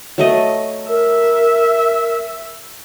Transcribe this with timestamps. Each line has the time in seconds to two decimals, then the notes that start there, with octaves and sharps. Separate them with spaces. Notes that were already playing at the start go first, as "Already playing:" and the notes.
0.18 F#3 A3 D#5
0.88 A#4 E5